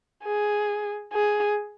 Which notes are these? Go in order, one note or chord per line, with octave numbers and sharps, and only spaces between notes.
G#4
G#4